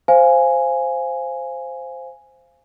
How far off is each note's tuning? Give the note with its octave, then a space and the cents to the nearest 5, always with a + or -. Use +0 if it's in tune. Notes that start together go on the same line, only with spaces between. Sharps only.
C5 +0 F5 -15 G#5 +0